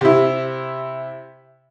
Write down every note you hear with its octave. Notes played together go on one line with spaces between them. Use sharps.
C3 E4